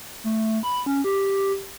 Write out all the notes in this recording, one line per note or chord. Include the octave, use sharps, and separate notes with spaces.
A3
B5
C#4
G4